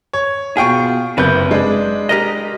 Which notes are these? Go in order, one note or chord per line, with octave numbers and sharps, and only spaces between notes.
C#5
B2 F4 G#4 G5 C#6
F#1 C3 B4 G6
G#3 D4
G4 A#4 D#5